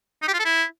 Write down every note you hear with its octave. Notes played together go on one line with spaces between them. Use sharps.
D#4
G4
F4
A4
E4